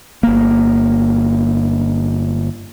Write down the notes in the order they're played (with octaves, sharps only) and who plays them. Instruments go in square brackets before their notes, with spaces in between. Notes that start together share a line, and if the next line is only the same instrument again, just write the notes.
[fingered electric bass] G1 A#3